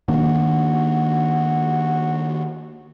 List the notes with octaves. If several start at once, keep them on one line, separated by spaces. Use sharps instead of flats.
D#3 A#3 D4 F#4